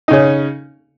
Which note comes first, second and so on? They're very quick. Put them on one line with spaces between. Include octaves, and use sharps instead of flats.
D#4 C#3 C#4